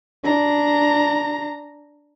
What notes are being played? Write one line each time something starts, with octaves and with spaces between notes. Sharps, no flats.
D4 A#5